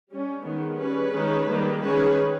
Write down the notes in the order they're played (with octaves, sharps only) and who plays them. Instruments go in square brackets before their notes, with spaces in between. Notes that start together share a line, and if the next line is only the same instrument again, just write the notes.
[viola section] G3 C#4
D#3 G#3 B3
G3 C#4 G#4 B4
D#3 G#3 C#4
D#3 G3 A#3
D#3 G#3 C#4 G#4 B4